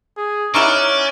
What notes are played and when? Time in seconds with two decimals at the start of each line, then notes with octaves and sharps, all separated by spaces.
0.17 G#4
0.54 C#4 D#4 E4 D5 F#5 C#6 F6